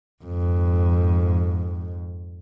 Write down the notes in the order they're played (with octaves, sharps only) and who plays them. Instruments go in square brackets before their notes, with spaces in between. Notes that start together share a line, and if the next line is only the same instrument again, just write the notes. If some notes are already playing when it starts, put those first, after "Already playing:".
[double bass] F2 G#2